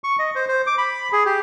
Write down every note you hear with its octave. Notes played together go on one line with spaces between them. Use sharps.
C#6
D#5
C5
C5
D6
B5
G#4
G4